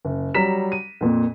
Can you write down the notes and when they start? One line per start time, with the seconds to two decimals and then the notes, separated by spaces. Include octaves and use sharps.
0.05 F#1
0.34 F#3 G3 A#5 B6 E7
0.72 D#7
1.01 F2 A#2